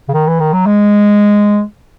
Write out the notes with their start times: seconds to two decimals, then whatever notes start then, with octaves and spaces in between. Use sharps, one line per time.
0.09 C#3
0.14 D#3
0.27 E3
0.40 D#3
0.53 F#3
0.66 G#3